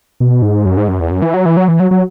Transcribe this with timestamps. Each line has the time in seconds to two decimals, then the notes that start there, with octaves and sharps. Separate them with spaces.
0.20 B2
0.42 G#2
0.65 F#2
0.77 G#2
0.88 F#2
1.00 E2
1.11 F#2
1.22 E3
1.34 F#3
1.46 E3
1.57 F#3
1.68 E3
1.80 F#3
1.91 F#3